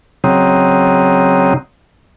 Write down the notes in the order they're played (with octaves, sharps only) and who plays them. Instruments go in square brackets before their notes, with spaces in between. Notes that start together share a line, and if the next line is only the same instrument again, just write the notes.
[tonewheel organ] C#3 F#3 C4 D#4